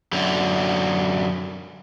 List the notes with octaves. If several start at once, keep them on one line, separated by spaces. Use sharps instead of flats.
F#2 D3